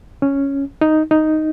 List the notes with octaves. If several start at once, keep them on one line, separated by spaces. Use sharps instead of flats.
C#4
D#4
D#4